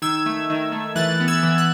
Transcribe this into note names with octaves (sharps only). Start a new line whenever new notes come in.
D#3 E6 G#6
A3
D#3
A3
E3 F#6 A6
B3
E6 G#6
E3
F#6